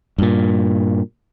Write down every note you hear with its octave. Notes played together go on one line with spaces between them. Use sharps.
G2 A#2